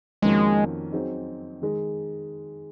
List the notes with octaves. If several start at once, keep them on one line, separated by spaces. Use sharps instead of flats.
F2 D#3 G#3 A#3 C#4 F#4
F#3 C4 D#4 G#4
D#3 G#3